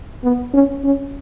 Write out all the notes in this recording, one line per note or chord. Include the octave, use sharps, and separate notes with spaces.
B3
C#4
C#4